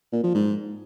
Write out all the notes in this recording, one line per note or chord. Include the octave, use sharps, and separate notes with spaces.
A#2
F3
G#2